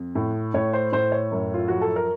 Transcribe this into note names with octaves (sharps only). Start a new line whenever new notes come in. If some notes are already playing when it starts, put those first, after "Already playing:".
Already playing: F2
A2
A2 C#5
C5
A2 C5
C#5
F#2
F4
F3 F#4
A4
A#4